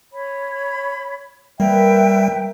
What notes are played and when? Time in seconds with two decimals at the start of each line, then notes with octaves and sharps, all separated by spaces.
0.12 C#5 B5
1.60 G3 A#3 B4 E5 G5